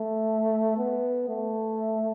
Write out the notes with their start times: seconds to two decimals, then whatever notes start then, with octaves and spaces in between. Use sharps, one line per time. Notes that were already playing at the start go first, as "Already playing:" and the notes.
Already playing: A3
0.77 B3
1.29 A3